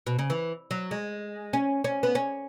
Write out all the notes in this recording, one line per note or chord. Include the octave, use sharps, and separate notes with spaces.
B2
C#3
E3
F#3
G#3
C#4
C#4
B3
C#4